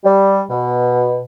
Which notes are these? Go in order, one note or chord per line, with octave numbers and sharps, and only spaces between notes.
G3
B2